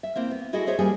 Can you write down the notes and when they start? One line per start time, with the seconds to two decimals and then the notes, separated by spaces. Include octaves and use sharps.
0.03 E5
0.15 A#3 C4 E4
0.31 B3
0.53 G#3 E4 F#4 G#4 A4 D#5
0.67 G#4 A4 C5 C#5 E5
0.79 A2 G3 A#3 C#4 G#4